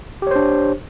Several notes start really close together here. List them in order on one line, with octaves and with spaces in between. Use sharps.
G4 C#5 C5 D4